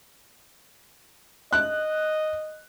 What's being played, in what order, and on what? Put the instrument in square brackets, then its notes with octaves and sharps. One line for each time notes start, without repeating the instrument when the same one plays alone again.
[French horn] D#5 [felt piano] F#6